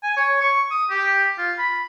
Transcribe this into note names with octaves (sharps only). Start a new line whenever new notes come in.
G#5
C#5
C#6
D#6
G4
F4
B5